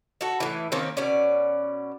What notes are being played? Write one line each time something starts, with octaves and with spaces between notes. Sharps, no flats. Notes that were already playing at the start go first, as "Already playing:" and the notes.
F#4 A4
A2 E3
D#3 A#3 C4 C#4
B2 C#4 D5